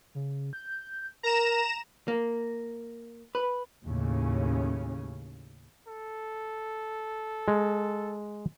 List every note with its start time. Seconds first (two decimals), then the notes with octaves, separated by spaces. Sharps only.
0.15 C#3
0.53 G6
1.23 A#4 A#5 E7
2.08 A#3
3.35 B4
3.85 D#2 A2 C#3 C#4
5.87 A4
7.48 G#3